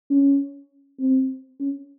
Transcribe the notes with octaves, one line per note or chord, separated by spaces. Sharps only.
C#4
C4
C#4